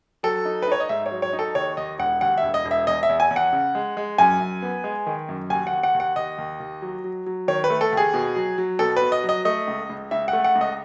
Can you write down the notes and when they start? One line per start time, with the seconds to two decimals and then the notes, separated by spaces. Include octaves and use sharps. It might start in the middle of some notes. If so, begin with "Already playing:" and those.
0.23 F#3 A4
0.45 D#4
0.62 B4
0.68 D#4 C#5
0.80 D#5
0.89 G#2 E5
1.06 C#5
1.11 F#3
1.22 C#5
1.33 D#4
1.39 A4
1.55 D#2 C#5
1.77 D#2 D#5
1.99 E1 F#5
2.21 D#2 F#5
2.38 E5
2.43 E1
2.54 D#5
2.65 E1
2.71 E5
2.87 E2 D#5
3.03 E5
3.09 E2
3.20 G#5
3.30 E2
3.36 F#5
3.53 C#3
3.75 G#3
3.97 G#3
4.18 F#2 G#5
4.41 F#2
4.62 B3
4.84 G#3
5.06 D#3
5.29 F#2
5.50 D#2 G#5
5.67 F#5
5.73 D#2
5.83 F#5
5.94 D#2
6.00 F#5
6.16 D#2 D#5
6.38 D#2
6.60 D#2
6.82 F#3
7.04 F#3
7.26 F#3
7.48 D#3 C#5
7.64 B4
7.70 A3
7.81 A4
7.92 D#2
7.97 G#4
8.14 B2
8.36 F#3
8.58 F#3
8.79 B2 A4
8.97 B4
9.02 B2
9.12 D#5
9.23 F#3
9.29 D#5
9.45 A3 D#5
9.68 C#2
9.90 C#2
10.11 C#2 E5
10.28 F#5
10.33 A3
10.44 F#5
10.55 C#2
10.61 D#5